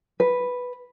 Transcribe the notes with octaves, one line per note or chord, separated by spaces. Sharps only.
B4